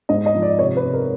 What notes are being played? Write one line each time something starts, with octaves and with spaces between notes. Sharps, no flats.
G#2 D#5
D#5
F3
D5
C3 C#5
B4
C3
A#4